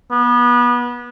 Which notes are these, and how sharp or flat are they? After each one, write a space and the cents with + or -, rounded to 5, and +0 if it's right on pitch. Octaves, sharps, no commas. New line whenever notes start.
B3 -25